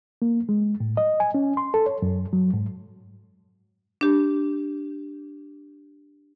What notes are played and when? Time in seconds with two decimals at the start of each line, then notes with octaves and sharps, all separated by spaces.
0.22 A#3
0.49 G#3
0.80 A2
0.97 D#5
1.20 G#5
1.34 C#4
1.57 C6
1.74 A4
1.86 C#5
2.02 F#2
2.33 F#3
2.54 G#2
4.01 D4 G4